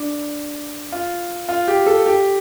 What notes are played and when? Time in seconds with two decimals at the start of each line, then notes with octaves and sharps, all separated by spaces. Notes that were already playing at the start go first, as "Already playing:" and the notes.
Already playing: D4
0.92 F4
1.49 F4
1.68 G4
1.86 A4
2.06 G4